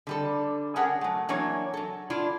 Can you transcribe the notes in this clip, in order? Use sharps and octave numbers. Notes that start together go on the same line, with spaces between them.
D3 G3 A4
C#4 D4 G#4 A#4 F#5 G5
F#3 A3
E3 F#3 A#3 D4 C#5
F#3 A4
D4 E4 F4